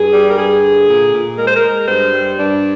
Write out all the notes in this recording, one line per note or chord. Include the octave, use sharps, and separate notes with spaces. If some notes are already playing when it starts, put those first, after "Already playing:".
Already playing: G2 G#4
G3
A#4
G2 G#4
D3
A#2
A#2
G#3 A#4
C5
A#4
G#3
G2 C5
G3
G2 D4